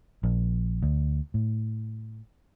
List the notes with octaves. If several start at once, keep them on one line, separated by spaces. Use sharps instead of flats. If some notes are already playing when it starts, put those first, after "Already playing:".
A#1
D2
A2